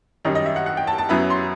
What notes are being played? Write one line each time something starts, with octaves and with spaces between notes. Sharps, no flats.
F#2 D#3 G3 D#5
D#5
E5
F#5
F#5
G5
A5
A5
F#2 F#3 B3 E4 B5
C6